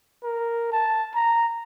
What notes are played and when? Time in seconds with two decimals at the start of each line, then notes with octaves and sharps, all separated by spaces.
0.23 A#4
0.72 A5
1.15 A#5